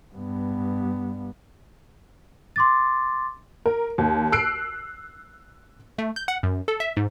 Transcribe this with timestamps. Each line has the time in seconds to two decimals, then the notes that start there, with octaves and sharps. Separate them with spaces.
0.15 G2 B3
2.56 C6 D6 A6
3.66 A#4
3.98 D#2
4.32 E6 F#6 C7 D7
5.98 A3
6.16 G6
6.28 F#5
6.43 F#2
6.68 A4
6.80 E5
6.97 G#2